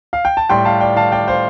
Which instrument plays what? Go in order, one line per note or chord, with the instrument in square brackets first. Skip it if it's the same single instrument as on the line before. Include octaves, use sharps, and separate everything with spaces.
[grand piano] F5
G5
A5
A2 G3 G5 C6
F5 A5
D5 G5
F5 A5
D5 G5
C5 F5